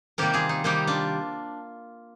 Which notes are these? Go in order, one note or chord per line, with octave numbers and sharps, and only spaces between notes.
C3 D#3 G3 A#3 G4 A#4
F4 G#4
D#4
C3 D#3 G3 A#3 D#4 G4
D4 F4